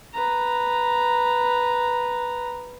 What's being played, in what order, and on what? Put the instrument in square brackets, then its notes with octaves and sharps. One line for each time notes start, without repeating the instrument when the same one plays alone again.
[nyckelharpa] B4 A#5